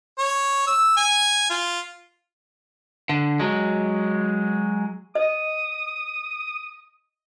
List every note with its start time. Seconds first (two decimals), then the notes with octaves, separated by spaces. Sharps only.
0.18 C#5
0.67 E6
0.97 G#5
1.50 F4
3.09 D3
3.40 F#3 G#3
5.15 D#5 D#6